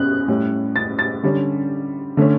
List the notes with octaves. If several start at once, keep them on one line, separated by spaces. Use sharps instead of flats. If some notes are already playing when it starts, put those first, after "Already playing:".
Already playing: B2 C#4 F#6
A2 G3 C#4
A6
A6
D3 G3 C#4
D3 A3 C#4